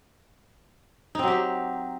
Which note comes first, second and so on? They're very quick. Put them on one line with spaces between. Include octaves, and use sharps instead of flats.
D#4 C4 F#3 G4